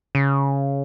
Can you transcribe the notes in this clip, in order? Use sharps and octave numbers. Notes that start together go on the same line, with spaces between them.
C#3